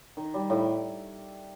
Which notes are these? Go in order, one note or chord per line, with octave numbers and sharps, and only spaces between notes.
D#3
G3
A2